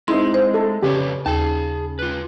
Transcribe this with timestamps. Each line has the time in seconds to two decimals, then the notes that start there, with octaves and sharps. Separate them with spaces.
0.08 G#3 C4 D#4 E4 C6
0.34 C5
0.54 A4
0.83 F2 C#3 G4 B4 C#5
1.26 D#2 G#4 A5
1.99 F4 B4